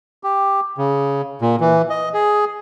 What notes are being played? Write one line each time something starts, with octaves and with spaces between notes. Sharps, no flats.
G4
C#3
A#2
E3
D#5
G#4